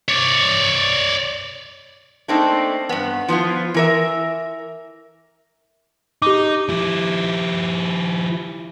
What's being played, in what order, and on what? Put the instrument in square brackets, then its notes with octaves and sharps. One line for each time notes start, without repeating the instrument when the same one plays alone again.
[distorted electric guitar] C#5 D5
[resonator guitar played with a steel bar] A3 A#3 C4 D4 D#4 A4
G2 B3
F3 B3 E4 F4
E3 A#4 E5
[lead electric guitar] D#4 [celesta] G4 D6
[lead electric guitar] F3 E4